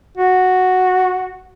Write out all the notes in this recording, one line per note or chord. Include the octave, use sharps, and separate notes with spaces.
F#4